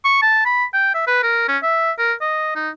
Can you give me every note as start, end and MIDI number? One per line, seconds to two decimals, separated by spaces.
0.05 0.18 85
0.22 0.44 81
0.45 0.65 83
0.74 0.92 79
0.94 1.03 76
1.07 1.19 71
1.23 1.46 70
1.48 1.58 61
1.63 1.92 76
1.98 2.13 70
2.21 2.53 75
2.55 2.70 63